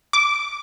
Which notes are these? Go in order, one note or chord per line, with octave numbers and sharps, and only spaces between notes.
D6